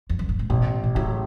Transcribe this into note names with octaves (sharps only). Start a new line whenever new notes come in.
E2
F#2
G#2
A2
A1 B2
B2
A2 C#3 F#3